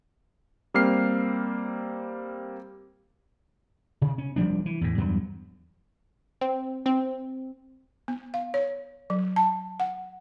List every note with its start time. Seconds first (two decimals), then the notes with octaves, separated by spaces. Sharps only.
0.74 G3 A#3 C4 F6 C7
4.02 C3
4.18 C#4
4.36 F1 F3 G3 D4
4.66 E3
4.81 E2 A2
4.98 E2 G2 F#3
6.41 C4
6.86 C4
8.08 B3
8.34 F5
8.54 C#5
9.10 F#3
9.36 A5
9.80 F#5